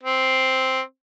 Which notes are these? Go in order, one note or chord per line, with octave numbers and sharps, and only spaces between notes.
C4